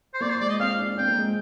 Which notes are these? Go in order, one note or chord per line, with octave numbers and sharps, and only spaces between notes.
C5
A#3 D5
C5
G#3 D5
D#5
C4 F5
D4
C4 G5
A#3
G#3